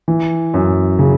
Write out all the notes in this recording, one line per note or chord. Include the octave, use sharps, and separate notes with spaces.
E3
F#2
C#3